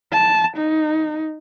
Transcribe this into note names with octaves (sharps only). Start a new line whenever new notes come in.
A5
D#4